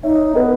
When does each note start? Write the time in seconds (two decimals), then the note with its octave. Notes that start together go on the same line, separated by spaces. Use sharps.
0.03 D#4 C#5 E5
0.35 B3 B4 D#5